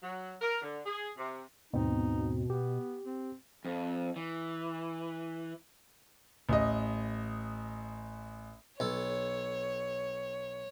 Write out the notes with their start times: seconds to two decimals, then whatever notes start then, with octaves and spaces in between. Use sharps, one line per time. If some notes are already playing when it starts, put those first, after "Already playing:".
0.03 F#3
0.41 A#4
0.62 D3
0.85 G#4
1.17 C3
1.73 D#2 G#2 B2 C4 D#4
2.50 B3 G4
3.06 C4
3.65 F2
4.16 E3
6.49 A1 D#5
8.80 B1 A4 C#5